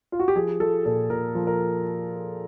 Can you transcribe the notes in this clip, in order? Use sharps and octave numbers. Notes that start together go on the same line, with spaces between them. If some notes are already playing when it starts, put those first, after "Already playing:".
F4
F#4
G4
F3 G#4
F3 A4
A#2 A4
A#2 A#4
F3
A#4